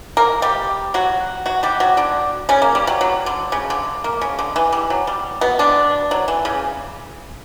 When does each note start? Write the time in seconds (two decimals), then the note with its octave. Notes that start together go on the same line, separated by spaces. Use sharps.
0.17 A#3 A#4
0.42 G3 G4
0.94 F#3 F#4
1.46 F#3 F#4
1.63 G3 G4
1.80 F#3 F#4
1.97 D3 D4
2.49 C#3 C#4
2.62 A#3
2.75 G3
2.87 F#3
3.01 F#3
3.26 D3
3.52 C#3
3.70 D3
4.04 A#3
4.21 C#3
4.39 D3
4.56 E3
4.73 G3
4.90 F#3
5.07 G3
5.41 B2 B3
5.59 D3 D4
6.11 F#3
6.28 E3
6.45 C#3